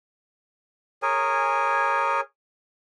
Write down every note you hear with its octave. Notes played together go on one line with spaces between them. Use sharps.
G#4 A#4 C#5 G#5